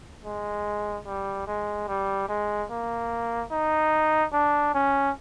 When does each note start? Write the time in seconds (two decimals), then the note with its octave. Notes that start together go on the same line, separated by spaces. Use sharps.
0.25 G#3
1.07 G3
1.47 G#3
1.88 G3
2.28 G#3
2.70 A#3
3.51 D#4
4.33 D4
4.74 C#4